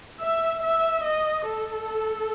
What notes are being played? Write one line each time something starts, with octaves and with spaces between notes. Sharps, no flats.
E5
E5
D#5
A4